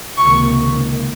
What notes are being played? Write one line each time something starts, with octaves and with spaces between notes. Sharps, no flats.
C#2 C3 D#3 A#3 C#6